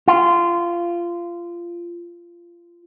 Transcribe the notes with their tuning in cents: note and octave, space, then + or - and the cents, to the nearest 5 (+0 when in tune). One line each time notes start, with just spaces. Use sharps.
F4 -20